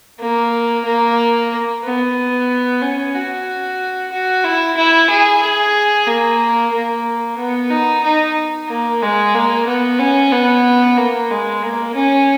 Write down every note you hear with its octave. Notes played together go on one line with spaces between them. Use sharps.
A#3
A#3
B3
C#4
F#4
F#4
E4
E4
G#4
G#4
A#3
A#3
B3
D#4
D#4
A#3
G#3
A#3
B3
C#4
B3
A#3
G#3
A#3
C#4